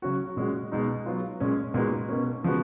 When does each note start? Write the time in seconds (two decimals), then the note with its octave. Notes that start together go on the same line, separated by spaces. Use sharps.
0.02 C#3 F#3 C#4 F#4
0.37 A#2 G#3 C#4 F#4
0.72 B2 G#3 D#4
1.06 F#3 B3 F4
1.40 A#2 G#3 C#4
1.74 A#2 G#3 B3 D#4 F#4
2.09 B2 A#3 C#4
2.44 C#3 F3 G#3 B3 F#4